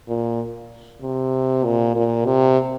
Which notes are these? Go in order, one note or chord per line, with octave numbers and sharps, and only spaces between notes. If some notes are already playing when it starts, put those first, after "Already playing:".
A#2
C3
A#2
A#2
C3